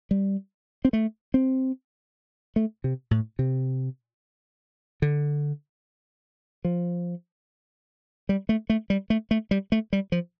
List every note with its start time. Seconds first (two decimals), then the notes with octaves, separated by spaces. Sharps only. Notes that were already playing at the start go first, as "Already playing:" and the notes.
0.11 G3
0.85 C4
0.93 A3
1.34 C4
2.56 A3
2.84 C3
3.11 A2
3.39 C3
5.02 D3
6.65 F3
8.29 G3
8.49 A3
8.70 A3
8.90 G3
9.10 A3
9.31 A3
9.51 G3
9.72 A3
9.93 G3
10.12 F3